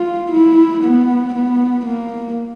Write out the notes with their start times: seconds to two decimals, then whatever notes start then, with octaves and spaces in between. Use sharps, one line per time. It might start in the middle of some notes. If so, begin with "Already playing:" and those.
Already playing: F4
0.31 E4
0.83 B3
1.34 B3
1.86 A#3